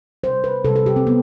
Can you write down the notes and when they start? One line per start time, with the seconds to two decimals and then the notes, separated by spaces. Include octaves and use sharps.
0.23 C3 G3 C5
0.44 B4
0.65 C3 G3 A4
0.76 A4
0.86 G4
0.96 C4
1.07 B3